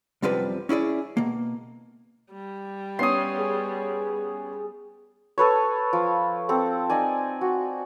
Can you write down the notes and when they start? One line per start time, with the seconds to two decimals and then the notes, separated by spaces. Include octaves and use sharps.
0.22 C2 F#2 C3 F3 G3 B4
0.69 C#4 E4 G#4 D5
1.17 B2 A#3
2.33 G3
2.99 B3 C#4 C#5 C6 D#6
3.38 G#4
5.38 A4 B4 C#5
5.93 F3
6.49 C4 A4
6.90 D#4 D5 G#5
7.41 F#4